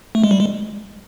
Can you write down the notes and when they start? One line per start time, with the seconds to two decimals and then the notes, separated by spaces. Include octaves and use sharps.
0.15 A3
0.24 G#3
0.31 G3
0.40 G#3